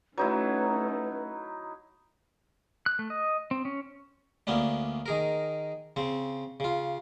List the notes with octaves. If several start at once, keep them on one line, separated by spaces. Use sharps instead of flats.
F#3 A3 C#4 D#4 E4 B4
F#6
A3
D#5
C4
C#4
D2 A#3 B3 C#4 D4
D#3 G#4 A#4
C#3 C4
C#3 F4